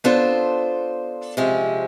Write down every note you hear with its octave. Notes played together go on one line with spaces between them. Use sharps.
B3 D4 F4 A4 C5
C3 F3 G#3 C#4